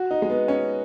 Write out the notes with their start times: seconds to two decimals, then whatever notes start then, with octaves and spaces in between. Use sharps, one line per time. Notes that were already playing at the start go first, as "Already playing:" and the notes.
Already playing: F#4
0.11 D#4
0.22 G#3
0.30 B3
0.48 C#4